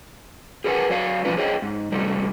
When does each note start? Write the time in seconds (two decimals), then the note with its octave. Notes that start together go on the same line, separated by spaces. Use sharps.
0.64 G#4 A#4 B4 D5 F#5 G#5
0.90 F#3 D5 F5
1.25 B2 D3 F3 D4 F4 B4
1.37 G#4 C5 C#5 D#5 G5
1.62 G#2
1.92 G2 C3 G3 A3 D4